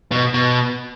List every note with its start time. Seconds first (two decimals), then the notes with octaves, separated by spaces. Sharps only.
0.11 B2
0.34 B2